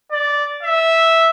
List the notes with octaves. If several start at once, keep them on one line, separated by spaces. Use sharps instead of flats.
D5
E5